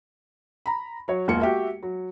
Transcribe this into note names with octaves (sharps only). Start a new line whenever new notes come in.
A#5 B5
F#3 C#5
E1 A#3 F4 C#7
F#4 G4 E5
F#3